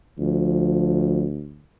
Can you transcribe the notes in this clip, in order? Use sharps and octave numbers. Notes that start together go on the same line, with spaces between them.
D2 F3